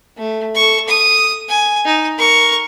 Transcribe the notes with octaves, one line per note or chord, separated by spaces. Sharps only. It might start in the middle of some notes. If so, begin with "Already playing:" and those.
A3
A4 C#6
D#6
G#5
D#4
A#4 C#6